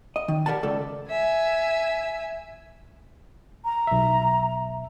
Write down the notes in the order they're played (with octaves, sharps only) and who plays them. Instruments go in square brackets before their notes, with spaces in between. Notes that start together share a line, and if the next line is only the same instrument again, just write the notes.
[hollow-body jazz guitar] D#5
D#3
G4 A#4 D5 F#5 A5
C#2 A4 D5
[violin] E5 G#5
[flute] A#5
[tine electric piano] B1 E5